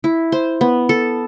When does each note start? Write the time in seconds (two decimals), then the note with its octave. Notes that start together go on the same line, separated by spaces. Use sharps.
0.04 E4
0.32 C5
0.61 B3
0.89 A4